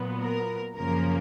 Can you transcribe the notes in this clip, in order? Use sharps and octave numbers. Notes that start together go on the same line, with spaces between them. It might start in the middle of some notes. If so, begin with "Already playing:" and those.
Already playing: A#2 F#3 B3
A#4
F#2 C#3 F3 A#3 A#4